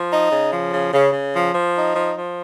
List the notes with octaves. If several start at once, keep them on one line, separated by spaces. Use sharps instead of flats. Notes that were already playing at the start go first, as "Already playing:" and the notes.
Already playing: F3
D#4
C#3
F3
C#3
C#3
C#3
F3
F3
D#4
F3
F3